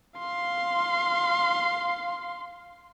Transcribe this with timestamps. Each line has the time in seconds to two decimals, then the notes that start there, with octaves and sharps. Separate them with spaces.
0.19 F5 C6